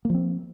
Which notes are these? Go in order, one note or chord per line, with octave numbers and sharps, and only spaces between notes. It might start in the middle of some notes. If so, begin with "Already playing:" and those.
F3 A#3 C4